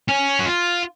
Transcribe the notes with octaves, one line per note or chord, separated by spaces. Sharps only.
C#4
F#4
F4